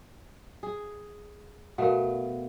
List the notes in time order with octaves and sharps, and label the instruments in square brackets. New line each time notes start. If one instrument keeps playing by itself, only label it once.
[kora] G#4
[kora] B2 A3 [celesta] A#4 F5 F#5